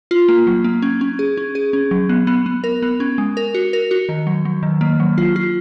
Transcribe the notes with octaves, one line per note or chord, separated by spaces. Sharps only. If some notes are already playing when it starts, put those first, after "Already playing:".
F4
A#3
F#3
A#3
C#4
C#4
G#4
C#4
G#4
C#4
F#3
B3
B3
B3
A#4
B3
C#4
G#3
A#4
F#4
A#4
F#4
D#3
F#3
F#3
D#3
A#3
F#3
F4
F4